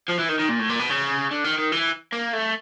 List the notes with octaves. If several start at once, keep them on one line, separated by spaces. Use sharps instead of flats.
F3
E3
D#3
D#3
A#2
A2
A#2
B2
C#3
D3
D#3
D#3
E3
A#3
A3